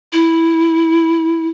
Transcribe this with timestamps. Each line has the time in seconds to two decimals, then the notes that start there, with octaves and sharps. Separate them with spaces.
0.13 E4